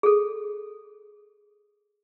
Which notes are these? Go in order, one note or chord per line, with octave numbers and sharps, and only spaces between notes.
G#4 A4